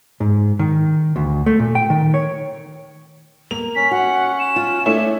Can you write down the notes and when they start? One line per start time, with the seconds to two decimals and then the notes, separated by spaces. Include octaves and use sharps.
0.20 G#2
0.59 D#3
1.16 D2
1.46 A3
1.59 A#2
1.75 G5
1.90 D#3
2.14 C#5
3.51 A#3 F7
3.75 C#4 B6
3.91 F#4 F#5
4.40 E7
4.56 F4
4.86 A3 D4 E4 C#5